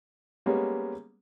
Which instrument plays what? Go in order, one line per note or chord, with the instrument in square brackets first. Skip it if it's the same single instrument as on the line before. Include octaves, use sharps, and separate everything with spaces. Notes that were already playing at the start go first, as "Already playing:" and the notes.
[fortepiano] G3 G#3 A#3 B3 C#4